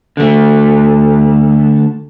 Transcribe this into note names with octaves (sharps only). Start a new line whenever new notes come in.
D3 A3